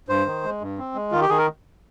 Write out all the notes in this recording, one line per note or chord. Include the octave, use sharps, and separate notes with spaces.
G2 C5
D#3
G#3
G2
C4
G#3
D#3 F4
G4
D#3 G#4
A#4